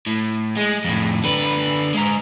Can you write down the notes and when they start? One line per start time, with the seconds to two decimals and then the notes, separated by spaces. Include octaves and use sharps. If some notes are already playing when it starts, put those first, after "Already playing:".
0.07 A2
0.56 G#3
0.84 F2 A2
1.24 D3 B4
1.94 G#3 A#5